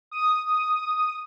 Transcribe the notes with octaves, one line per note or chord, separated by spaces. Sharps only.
D#6